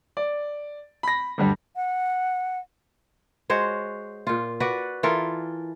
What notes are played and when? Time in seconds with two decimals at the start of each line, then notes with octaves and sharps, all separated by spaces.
0.17 D5
1.03 B5 A#6
1.38 D2 G2 G3
1.76 F#5
3.50 G#3 F#4 C5 C#5
4.27 A#2 F4
4.60 F#4 B4 D5
5.03 E3 F4 A4 A#4